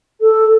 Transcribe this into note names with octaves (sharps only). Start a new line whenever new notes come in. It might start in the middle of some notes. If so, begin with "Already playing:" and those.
A4